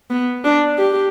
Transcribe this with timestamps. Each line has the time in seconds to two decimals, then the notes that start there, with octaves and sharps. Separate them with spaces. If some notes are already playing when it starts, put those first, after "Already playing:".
0.10 B3
0.45 D4
0.78 G4